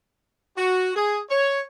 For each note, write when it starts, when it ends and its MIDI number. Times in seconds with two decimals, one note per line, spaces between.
0.57 0.92 66
0.96 1.19 68
1.30 1.60 73